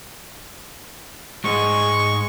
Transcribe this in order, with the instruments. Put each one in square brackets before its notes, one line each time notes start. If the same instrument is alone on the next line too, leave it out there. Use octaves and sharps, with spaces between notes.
[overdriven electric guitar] G#2 [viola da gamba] G#3 [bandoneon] C#6